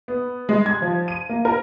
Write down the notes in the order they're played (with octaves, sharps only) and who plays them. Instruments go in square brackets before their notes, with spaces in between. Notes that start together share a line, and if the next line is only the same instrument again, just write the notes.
[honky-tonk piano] B3
G#3
G#6
F3
D#7
A#3
A#4